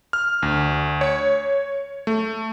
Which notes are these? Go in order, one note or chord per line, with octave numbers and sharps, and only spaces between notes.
F6
D2
C#5
A3